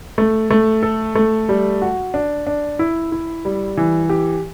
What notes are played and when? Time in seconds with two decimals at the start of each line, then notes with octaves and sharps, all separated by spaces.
0.18 A3
0.50 A3
0.83 A4
1.15 A3
1.49 G3
1.82 F#4
2.14 D4
2.47 D4
2.79 E4
3.12 E4
3.45 G3
3.77 E3
4.10 G4